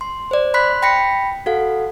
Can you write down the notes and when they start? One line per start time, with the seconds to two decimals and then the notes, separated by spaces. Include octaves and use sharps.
0.01 C6
0.31 C5 D5
0.54 B5 C6 F#6 B6
0.82 G5 B5 A#6 B6 C#7
1.46 F#4 A4 F5 F#5